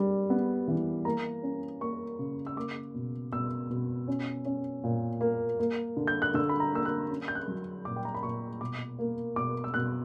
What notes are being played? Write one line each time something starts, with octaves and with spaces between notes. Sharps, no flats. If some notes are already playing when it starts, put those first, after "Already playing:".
Already playing: G3 D4
B3
E3
A#3 A#5
C#4
A#3 C#6
C#3
E6
A#3 D6
B2
B2 E6
B2
C#4
C#4
A#2
A#3
A#3
D3
G6
F#6
D3 E6
B5
A#5
A#3 E6
F#6
C#4
G6
F#6
F#3
A#2 D6
G5
A#5
B5
A#2 C#6
B2 D6
A#3
B2 D6
E6
B2 F#6